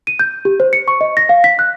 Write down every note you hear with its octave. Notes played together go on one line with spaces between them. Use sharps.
D#7
G6
G4
C5
C#7
C#6
D#5
A#6
F5
B6
F#6